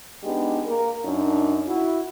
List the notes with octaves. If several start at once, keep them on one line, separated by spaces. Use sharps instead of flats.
G#3 B3 D4 D#4 G4
A#3 A#4
F#2 D4 D#4
E4 F#4